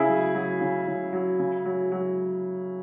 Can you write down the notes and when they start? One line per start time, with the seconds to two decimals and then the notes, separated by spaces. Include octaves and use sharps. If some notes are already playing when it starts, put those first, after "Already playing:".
Already playing: C#3 E4 G#4
0.09 F#3
0.35 F#3
0.61 C#3
0.87 C#3
1.13 F#3
1.39 C#3
1.66 F#3
1.92 F#3